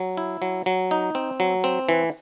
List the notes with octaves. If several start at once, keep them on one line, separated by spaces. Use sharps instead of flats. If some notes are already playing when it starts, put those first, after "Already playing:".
Already playing: F#3
E4
F#3
F#3
D#4
C4
F#3
C4
E3